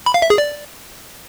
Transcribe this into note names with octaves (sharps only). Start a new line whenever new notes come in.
B5
F5
E5
G#4
D5